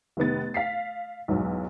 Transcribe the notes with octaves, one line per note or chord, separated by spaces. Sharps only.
F1 D#3 B3 A6
F5 B6 C7
B1 E2 G#2 F#3